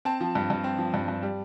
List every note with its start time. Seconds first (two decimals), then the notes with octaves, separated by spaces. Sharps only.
0.05 C4 A5
0.21 F3
0.35 G2
0.50 G2
0.64 C4
0.79 F3
0.94 G2
1.08 G2
1.23 G3